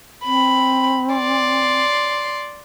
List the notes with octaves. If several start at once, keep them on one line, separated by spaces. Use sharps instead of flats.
C4 B5
D5 C6